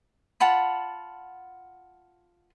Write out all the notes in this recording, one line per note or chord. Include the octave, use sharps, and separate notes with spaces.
F4 F#5 A5 B5